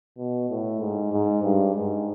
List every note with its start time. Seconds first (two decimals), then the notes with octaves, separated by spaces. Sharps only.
0.18 B2
0.49 A2
0.81 G#2
1.13 G#2
1.43 G2
1.75 G#2